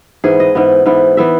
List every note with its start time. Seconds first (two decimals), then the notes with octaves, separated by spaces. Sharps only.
0.24 G#2 E3 B3 G#4
0.40 D#5
0.55 G#2 E3 B3
0.86 G#2 E3 B3
1.17 E3 B3 E5